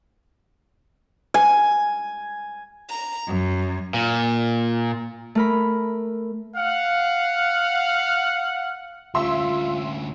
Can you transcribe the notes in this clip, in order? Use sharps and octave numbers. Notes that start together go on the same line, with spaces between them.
G#5
A#5
F#2
A#2
A3 A#4 B5
F5 F#5
D2 C#4 F4 E5 C6